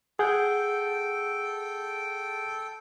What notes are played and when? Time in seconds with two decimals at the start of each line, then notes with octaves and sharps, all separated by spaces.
0.19 G#4 A4 F#5 G5 G6